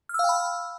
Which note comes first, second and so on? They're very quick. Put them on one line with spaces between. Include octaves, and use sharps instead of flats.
F6 E6 F5 G5 B5